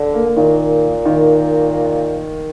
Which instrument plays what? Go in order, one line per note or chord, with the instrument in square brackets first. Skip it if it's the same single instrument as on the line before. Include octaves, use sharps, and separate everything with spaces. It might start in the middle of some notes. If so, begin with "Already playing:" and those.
Already playing: [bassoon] D3
[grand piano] A#3
[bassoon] A#2 [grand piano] D#3
[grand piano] D#3